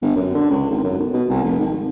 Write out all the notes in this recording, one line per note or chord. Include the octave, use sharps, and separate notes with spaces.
G1
F#2
D3
C#2
G#1
F#2
B1
B2
C2
F1
G#1
G#1